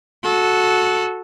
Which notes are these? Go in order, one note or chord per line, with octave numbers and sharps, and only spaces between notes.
F#4 A4